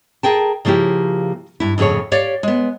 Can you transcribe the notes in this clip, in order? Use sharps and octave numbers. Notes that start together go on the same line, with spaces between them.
G#4 A#4 G5 A5
C#3 F3 A#3 E4 G4
G2 E4
F2 A2 C#3 G#4 C#5
G4 C#5 D5 F5
G#3 B3